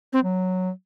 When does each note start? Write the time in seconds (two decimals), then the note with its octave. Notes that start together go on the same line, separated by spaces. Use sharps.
0.13 C4
0.23 F#3